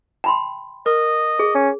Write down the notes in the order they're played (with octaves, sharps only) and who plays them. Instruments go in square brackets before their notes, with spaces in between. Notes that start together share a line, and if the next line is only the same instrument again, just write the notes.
[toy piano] G5 B5 C6 [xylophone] A5
[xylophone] A#4 [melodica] D#5
[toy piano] G#4
[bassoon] C#4